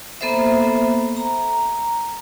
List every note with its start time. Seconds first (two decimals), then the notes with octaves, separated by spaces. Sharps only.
0.21 A#3 B3 A4 C5 E5
1.17 A#5